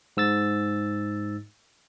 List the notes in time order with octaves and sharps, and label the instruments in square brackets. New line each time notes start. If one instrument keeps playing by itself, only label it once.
[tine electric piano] G#2 E6 A6